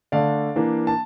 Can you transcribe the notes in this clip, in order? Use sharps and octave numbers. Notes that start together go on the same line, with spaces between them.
D3 A3 D4 D5 F5
E3 A#3 D4
A5